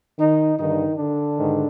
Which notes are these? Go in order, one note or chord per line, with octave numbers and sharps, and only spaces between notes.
D#3 D#4
G2 D3 D#3 D#4
D3 D4
G#2 D#3